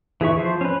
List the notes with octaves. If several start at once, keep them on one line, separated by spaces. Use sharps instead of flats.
E3 G#4 E5 C#6
F3 C5
C#4 B4